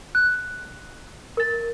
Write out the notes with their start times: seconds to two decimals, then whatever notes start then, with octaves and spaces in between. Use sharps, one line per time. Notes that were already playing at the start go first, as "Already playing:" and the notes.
0.15 F#6
1.37 A#4 A6